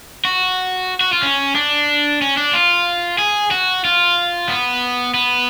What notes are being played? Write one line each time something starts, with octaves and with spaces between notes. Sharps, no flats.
F#4
F#4
F4
C#4
D4
C#4
D4
F4
G#4
F#4
F4
B3
B3